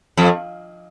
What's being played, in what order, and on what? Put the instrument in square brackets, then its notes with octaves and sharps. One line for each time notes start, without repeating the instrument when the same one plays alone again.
[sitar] F2